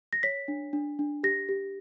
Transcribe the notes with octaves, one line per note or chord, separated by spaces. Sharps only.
A#6
C#5 B6
D4
D4
D4
G4 A#6
G4